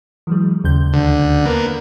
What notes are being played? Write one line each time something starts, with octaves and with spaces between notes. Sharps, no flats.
E3 F#3 G#3
D#2 C#3 G6
D2 D3
A#3 B3